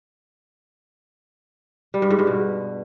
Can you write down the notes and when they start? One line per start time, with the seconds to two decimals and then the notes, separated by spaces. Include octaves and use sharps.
1.94 G3
2.02 G2
2.10 G#2
2.19 G2
2.27 B2